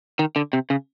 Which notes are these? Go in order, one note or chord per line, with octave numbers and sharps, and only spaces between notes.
D#3
D3
C3
C#3